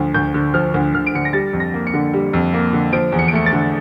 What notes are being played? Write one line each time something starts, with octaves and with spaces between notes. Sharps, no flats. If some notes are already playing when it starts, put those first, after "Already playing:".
Already playing: D2 F3
D2 G6
D3
F3 F6
D2
D2 F6
D7
D3 C#7
A#6
G3 A6
F2
A#6
A#3
C#7
D3
G3
F2
A#3
D3
F3 D7
E2
C#7
D7
A3 C#7
A6
D3